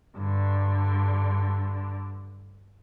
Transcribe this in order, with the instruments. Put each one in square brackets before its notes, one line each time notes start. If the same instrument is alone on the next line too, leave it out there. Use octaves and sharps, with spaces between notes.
[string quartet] G2 D3